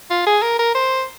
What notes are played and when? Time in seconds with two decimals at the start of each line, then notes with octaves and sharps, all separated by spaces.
0.11 F4
0.26 G#4
0.42 A#4
0.59 A#4
0.75 C5